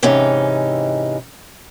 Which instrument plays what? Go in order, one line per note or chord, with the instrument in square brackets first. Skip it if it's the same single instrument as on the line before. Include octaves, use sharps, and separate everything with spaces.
[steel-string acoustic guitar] G#2 C3 E3 C#4 D#4